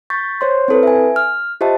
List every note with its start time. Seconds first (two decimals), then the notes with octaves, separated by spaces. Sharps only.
0.10 C#6 G6 A6 B6
0.41 C5 C#5 C6
0.68 C4 E4 A4 B4
0.83 E5 G#5
1.16 F6
1.61 F4 G4 C5 D#5 E5 A5